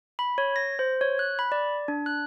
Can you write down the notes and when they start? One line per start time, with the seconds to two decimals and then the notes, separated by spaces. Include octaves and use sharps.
0.19 B5
0.38 C#5
0.56 A#6
0.79 C5
1.01 C#5
1.19 F#6
1.39 B5
1.52 D5
1.88 D4
2.06 F#6